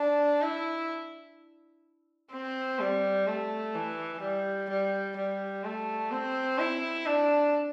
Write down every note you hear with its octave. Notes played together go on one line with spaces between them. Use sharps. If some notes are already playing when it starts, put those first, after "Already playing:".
Already playing: D4
E4
C4
G3
A3
E3
G3
G3
G3
A3
C4
E4
D4